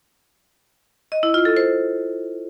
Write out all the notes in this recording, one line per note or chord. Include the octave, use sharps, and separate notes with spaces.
D#5
E4
F4
A4
C5